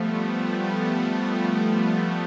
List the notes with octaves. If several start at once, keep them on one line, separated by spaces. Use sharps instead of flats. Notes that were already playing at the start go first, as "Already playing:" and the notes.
Already playing: F3 G3 A3 B3
G3 B3